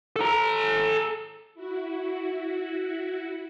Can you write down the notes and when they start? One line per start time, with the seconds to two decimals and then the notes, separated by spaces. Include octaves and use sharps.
0.16 A4 A#5
1.54 E4 F#4